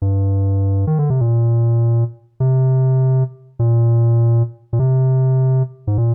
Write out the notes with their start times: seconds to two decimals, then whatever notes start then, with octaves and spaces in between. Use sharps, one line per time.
0.02 G2
0.87 D#3
0.99 D3
1.10 C3
1.21 A#2
2.40 C3
3.59 A#2
4.73 A#2
4.79 C3
5.87 G#2
5.98 A#2